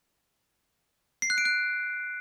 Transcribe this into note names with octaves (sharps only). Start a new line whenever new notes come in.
C7
F#6
D7
F#6